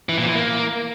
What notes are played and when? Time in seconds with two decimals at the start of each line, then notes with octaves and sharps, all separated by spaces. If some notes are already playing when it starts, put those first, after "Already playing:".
0.09 E3
0.18 A#2
0.27 E3
0.36 A#3